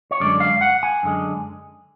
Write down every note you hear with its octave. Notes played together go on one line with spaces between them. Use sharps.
C#5
F#2 D3 G#3 D5
F5
F#5
G#5
F#2 D3 G#3